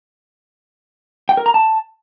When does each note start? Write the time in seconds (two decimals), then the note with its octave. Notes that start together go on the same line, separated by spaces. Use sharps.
1.29 G5
1.37 A#4
1.46 A#5
1.54 A5